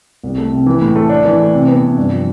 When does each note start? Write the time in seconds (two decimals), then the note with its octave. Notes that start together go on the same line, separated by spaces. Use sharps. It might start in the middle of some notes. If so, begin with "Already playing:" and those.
0.24 C2
0.38 A3
0.51 C3
0.66 E3
0.82 A2
0.96 A3
1.09 D4
1.25 E3
1.39 A3
1.53 C3
1.68 B3
1.82 C3
1.98 G2
2.12 F3